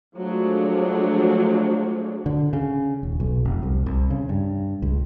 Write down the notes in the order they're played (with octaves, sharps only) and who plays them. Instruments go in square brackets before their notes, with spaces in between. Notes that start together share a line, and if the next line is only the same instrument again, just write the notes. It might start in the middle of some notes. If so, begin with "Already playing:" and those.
[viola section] F3 F#3 G#3 A3 D4
[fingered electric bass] D3
C#3
D#1
B1
F1
C2
C2
C#3
G2
C#2